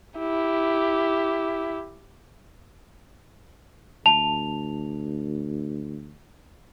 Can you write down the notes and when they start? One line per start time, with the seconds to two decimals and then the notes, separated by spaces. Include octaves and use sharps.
0.19 E4 G4
4.06 D2 A5 F7